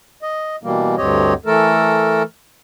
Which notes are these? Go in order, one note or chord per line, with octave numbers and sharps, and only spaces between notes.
D#5
B2 E3 G3 A#3
D2 G2 C4 G4 C#5 D#5
E3 A3 A4 A#4